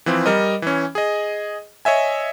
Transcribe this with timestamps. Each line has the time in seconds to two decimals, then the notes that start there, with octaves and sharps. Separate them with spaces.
0.06 E3 F3 C4
0.26 G3 A#4 D#5
0.62 E3 C#4
0.95 G#4 D#5
1.85 C#5 D#5 E5 G#5